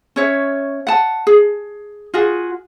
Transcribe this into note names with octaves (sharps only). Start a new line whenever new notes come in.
C#4 C#5 E5
F#5 A5
G#4
F4 F#4 G#4